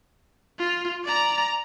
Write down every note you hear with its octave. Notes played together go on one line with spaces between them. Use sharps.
F4
D5 A#5